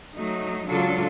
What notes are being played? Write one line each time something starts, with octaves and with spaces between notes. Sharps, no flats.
F#3 A3 D#4
C#3 F#3 G#3 D4 F4 A4